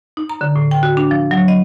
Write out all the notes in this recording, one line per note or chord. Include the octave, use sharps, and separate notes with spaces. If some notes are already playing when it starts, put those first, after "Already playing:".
D#4
A#5
D3
A2
G5
F#4
D4
F3
F#3
D#5